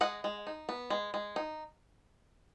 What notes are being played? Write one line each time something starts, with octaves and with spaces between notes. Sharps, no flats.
G#3 D#5 F#5
G#3
D#4
B3
G#3
G#3
D#4